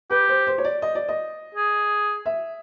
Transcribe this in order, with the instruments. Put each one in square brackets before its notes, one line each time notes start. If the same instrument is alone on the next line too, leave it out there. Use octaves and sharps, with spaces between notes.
[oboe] G4 [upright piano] B4
[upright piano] C5
C5
C#5
D5
D#5
D5
D#5
[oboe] G#4
[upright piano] E5